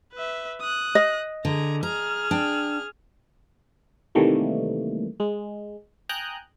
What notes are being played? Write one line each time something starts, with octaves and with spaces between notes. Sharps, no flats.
B4 E5
D#6 F#6
D#5
D3 G#4 A#5
G#4 A#5 F6
D4 G5
C3 D#3 E3 G3 A3 A#3
G#3
G5 G#5 A#5 D#6 F#6 G6